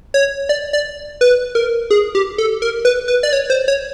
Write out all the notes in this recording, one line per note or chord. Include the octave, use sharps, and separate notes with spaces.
C#5
D5
D5
B4
A#4
G#4
G4
A4
A#4
B4
B4
D5
C#5
C5
C#5